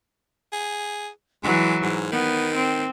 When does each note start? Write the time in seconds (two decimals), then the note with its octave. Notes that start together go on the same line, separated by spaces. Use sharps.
0.53 G#4
1.43 E3 F#3 G#3
1.83 G#2
2.12 D#3 B3
2.56 C4